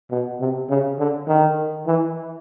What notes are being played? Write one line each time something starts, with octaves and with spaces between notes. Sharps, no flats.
B2
C3
C#3
D3
D#3
E3